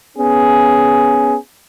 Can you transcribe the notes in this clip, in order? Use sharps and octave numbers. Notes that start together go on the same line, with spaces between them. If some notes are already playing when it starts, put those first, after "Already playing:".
B3 C#4 G#4